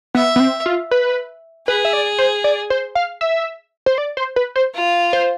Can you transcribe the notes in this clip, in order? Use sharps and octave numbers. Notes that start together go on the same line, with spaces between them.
B3 E5
B3
C4
F4
B4
G#4 B4
E5
D5
C5
D5
C5
F5
E5
C5
D5
C5
B4
C5
F4
C5